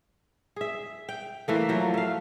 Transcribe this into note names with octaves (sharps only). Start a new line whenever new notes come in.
G#4 E5
G5
E3 A3 A#3
F3 F#3
A3 F5